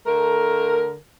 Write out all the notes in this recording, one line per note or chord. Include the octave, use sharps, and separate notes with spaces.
D3 A3 A#4